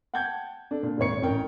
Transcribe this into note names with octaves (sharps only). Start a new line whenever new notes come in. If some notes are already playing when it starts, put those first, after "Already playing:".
F#5 G5 A5 G6 G#6
D4 A4
A#2 D3
D#1 G#1 C4 C#5 C#7
A1 C#4 A#4 G5